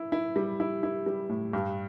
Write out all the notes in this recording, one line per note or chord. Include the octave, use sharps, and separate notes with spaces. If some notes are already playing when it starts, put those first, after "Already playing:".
Already playing: E4
E4
G3
E4
E4
G3
A2
G2